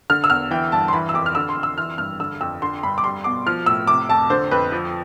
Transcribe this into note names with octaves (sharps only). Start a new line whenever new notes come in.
D3 F6
E6
E2 F6
E3 G5
G2 A5
C6
E3 B5
E6
F2 D6
F6
D3 E6
C6
F2
E6
E3 F6
G2 F6
D3 E6
F2 E6
D3 C6
G2 B5
D6
G3 C6
B2 D6
F3 F6
A2 E6
C3 D6
F2 A5
D3 C5
F2 B4
F3